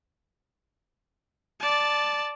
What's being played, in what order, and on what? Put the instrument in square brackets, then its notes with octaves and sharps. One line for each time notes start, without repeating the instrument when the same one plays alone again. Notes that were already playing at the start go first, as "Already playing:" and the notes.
[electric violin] D5 A5